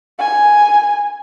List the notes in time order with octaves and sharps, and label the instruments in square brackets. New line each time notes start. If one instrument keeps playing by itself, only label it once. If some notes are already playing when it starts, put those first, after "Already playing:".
[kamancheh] G#5